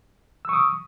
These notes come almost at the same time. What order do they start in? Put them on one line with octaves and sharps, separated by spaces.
E6 C#6 D#6